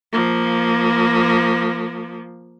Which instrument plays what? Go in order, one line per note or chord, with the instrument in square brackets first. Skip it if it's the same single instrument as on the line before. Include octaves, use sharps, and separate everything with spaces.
[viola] F3 A#3